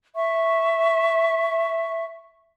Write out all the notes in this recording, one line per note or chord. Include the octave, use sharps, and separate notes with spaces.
E5 C#6